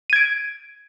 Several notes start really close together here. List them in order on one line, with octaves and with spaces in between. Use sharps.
D#7 G#6 D7